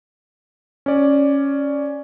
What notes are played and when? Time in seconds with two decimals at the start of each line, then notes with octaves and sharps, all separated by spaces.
0.86 C#4 D5